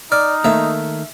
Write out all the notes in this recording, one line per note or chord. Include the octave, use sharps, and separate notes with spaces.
D#4 D5 F6
D#3 A3 A#3 E5